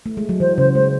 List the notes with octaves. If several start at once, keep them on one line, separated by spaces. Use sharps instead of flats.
A3
G#3
F#3
E3 C5
C#3 C5
G#3 C5